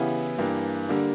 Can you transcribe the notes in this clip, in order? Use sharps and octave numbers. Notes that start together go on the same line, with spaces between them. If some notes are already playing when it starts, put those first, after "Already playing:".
Already playing: C#3 E3 B3 E4 G4
G2 E3 A#3 D4 G4
D3 G3 A#3 D4